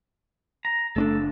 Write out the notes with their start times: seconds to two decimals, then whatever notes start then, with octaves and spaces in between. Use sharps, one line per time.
0.65 A#5
0.96 F#1 A3 C#4 D4 A4